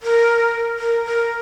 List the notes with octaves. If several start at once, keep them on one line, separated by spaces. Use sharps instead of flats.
A#4
A#4
A#4